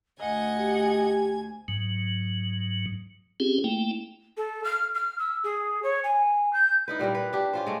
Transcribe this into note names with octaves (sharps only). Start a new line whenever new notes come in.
D2 D#5 F#5 G#5 G#6
G4
G#2 F#3
C4 C#4 F4 G4 G#4
A3 A#3 E4 G5
A4
F6
F6
E6
G#4
C#5
G#5
G6
D#4 E4 B4
A#2 G3 E4 A#4
B4
D4 G4
C#4 F4 C5
G#3 A3